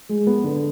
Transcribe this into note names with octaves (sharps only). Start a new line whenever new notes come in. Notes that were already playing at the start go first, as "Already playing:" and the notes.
G#3
B3
D3